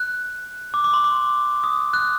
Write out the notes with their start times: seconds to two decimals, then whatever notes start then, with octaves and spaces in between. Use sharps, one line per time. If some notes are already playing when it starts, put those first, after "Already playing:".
Already playing: F#6
0.74 D6
0.84 D6
0.94 C6
1.04 D6
1.64 D#6
1.93 F#6